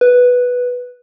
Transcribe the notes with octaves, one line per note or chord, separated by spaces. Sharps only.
B4